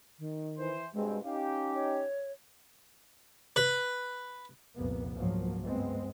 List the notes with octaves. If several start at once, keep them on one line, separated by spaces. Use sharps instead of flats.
D#3
E3 C5
G2 B2 G#3 C4
C#4 D#4 G4 F5
C#5
B4
F1 C2 A#2 A#3 B3
C#2 G#2 F3 F#3 A#3
G2 G#3 B3 C4